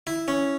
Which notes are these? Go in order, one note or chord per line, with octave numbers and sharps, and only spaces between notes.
E4
C#4